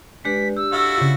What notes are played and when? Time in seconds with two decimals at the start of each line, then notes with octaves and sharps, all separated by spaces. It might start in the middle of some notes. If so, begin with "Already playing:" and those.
0.25 G#3 D4 G4 B4 B6
0.57 G4 E6
0.72 E4 F#4 A4 F5
0.97 C#3 F4